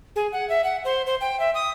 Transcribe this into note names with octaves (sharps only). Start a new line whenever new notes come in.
G#4
F#5
E5
F#5
C5
C5
G5
E5
D#6